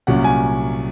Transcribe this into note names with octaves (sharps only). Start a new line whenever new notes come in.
C2 A#2 F#3 C#4 F#5
G#5